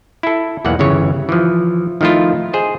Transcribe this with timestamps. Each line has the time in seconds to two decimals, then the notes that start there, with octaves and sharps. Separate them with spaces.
0.23 E4 A4
0.65 B1 E2 E3 A#3 F#5
0.79 G1 C#3 E3 C#5
1.29 E3 F3
2.01 D#3 F3 A3 E4 F4
2.53 G#4 C5 D#5